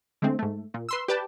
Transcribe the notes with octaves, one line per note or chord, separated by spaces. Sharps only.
D3 G#3 A3 C4
G#2 A3
A#2
B4 C6 E6
G4 B4 D5 G5 A5